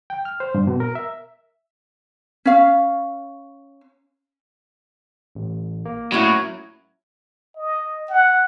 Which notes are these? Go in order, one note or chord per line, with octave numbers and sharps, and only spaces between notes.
G5
F6
C5
G2
B2
A#4
E5
C#4 F5
A1
A#3
A2 F#3 C#4 E4 F#4
D#5
F#5